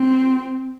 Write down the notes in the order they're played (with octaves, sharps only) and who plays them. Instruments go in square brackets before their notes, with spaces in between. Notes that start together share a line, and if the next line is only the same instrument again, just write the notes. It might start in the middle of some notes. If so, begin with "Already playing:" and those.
Already playing: [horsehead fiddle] C4